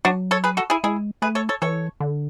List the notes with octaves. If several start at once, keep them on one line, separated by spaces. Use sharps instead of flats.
F#3 D4 F#4
A4 C#5
G#4 B4
F#4 A4
E4 G#4
G#3 E4 G#4
A3 G#4 B4
A4 C#5
A4 C#5
E3 A4 C#5
D3